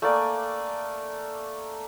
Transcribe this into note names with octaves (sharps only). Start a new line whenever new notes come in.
A3 A#3 D5 G#5